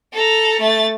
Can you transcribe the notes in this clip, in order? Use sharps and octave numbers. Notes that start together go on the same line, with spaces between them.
A4 A#5
A3 A6